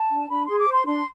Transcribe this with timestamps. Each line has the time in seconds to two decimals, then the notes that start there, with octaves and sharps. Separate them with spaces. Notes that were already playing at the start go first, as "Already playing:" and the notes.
Already playing: A5
0.11 D4
0.30 D4 B5
0.45 G#4 C6
0.58 D6
0.68 C5 C6
0.86 D4 C6